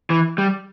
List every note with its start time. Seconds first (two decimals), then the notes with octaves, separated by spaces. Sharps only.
0.10 E3
0.38 G3